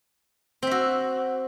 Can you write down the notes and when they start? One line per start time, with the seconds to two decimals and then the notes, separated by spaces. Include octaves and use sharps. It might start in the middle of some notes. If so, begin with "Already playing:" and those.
0.63 C4
0.67 E5
0.71 F#4